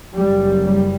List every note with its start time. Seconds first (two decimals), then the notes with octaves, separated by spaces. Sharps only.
0.18 F#1 F#2 G3
0.65 G3